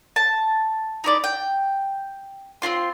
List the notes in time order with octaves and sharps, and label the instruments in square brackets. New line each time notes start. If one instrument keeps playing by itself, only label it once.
[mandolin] A5
D#4 E4 C#5 D5
G5
C4 C#4 F4 C6